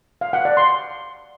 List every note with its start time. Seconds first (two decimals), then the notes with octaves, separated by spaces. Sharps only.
0.21 F5
0.33 F#5
0.45 D5
0.57 C6